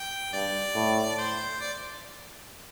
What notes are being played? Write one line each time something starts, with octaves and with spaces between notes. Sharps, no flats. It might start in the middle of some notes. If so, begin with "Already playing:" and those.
Already playing: G5
G2 D5
A2
C5
D5